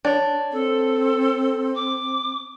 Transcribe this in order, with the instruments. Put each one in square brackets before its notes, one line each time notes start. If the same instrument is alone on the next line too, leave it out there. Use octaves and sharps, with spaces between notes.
[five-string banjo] D4 C#5
[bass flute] C4 [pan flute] A4
[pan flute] D6